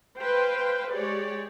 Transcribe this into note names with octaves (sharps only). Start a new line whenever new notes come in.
B4 C5 F5 G5
G#3 G4 G#4 C#5 D5